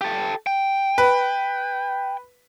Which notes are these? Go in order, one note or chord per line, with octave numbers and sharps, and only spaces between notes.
G4 A4
G5
B4